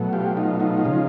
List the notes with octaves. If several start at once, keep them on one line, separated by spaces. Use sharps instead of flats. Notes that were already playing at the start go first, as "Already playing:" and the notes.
Already playing: B2 F#3 A3
F4 G4
D#4 F4
D#4 F4
C#3 F3 G#3